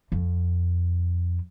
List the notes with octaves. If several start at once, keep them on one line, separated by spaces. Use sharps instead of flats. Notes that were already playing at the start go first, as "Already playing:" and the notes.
F2